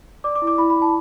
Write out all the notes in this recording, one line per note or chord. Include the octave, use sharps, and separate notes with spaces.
D5 D6
D6
E4
D6
E4 B5
B5
E4
A5